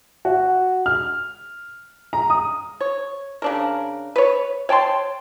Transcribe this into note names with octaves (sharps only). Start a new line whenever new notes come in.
F#4
F6
A#5
D#6
C#5
C#3 D4 A#4
B4 C#5
C#5 G5 A5 C6